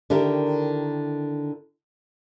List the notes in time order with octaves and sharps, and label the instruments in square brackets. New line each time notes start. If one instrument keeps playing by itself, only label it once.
[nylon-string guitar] D3 D#3 E4 G4 A#4